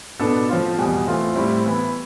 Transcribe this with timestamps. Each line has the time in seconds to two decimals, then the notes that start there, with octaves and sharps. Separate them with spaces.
0.20 B2 B3 D4 A4
0.49 F3 C4 F4
0.78 E2 B2 G3
1.07 E3 A3 C4 F4
1.36 A2 G3 C4 E4
1.65 E3 B3 E4